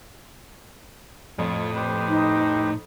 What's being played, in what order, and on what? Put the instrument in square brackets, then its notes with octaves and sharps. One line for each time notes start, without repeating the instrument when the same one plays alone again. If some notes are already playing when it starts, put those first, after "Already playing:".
[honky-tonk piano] F2 [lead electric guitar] A2 [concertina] F4 C#5 C#6
[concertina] G4 B4 C5
[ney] D#4